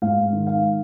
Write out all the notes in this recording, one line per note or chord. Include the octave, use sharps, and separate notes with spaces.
G#2 F5
D#3
F5